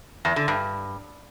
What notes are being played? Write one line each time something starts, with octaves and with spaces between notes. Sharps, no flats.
E2
D3
G2